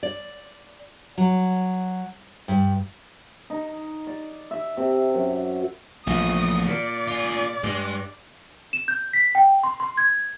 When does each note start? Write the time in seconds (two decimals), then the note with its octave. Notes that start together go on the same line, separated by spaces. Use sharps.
0.03 D5
1.18 F#3
2.48 G2
3.50 D#4
4.07 D5
4.51 E5
4.77 C3
5.14 F#2
6.07 A#1 E2 A2 D#6
6.68 A#2 D5
7.07 F4 G#4
7.63 G2 G#3
8.73 E7
8.88 G6
9.13 B6
9.35 G5
9.63 C6
9.80 C6
9.97 G#6